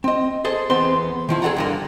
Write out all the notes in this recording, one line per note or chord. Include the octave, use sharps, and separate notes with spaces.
C4 D#5
G#4 A4 C5 D#5
E2 B3 C4 C5 C6
D#3 F3 E4
G#4 A4 D5 F#5 A#5
G2 D3 A#3